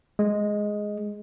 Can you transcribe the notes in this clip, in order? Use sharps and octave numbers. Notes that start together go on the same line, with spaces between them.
G#3